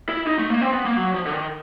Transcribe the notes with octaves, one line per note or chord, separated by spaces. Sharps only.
E4
D#4
A3
A#3
C4
B3
A#3
F#3
F3
D3
D#3